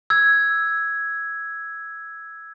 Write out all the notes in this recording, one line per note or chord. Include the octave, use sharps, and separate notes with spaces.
E6 G#6